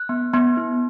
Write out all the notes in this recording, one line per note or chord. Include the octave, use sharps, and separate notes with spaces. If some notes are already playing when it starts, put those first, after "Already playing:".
Already playing: F#6
B3
B3
E4